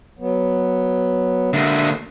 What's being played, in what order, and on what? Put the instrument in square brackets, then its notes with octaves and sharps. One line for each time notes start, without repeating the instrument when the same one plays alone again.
[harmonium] F#3 B3
[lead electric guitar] D3 A#3 [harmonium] E5